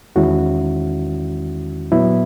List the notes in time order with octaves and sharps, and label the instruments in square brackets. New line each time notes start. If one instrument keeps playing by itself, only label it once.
[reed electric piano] E2 D#3 G#3 C#4 E4 F#4
A#2 F#3 B3 E4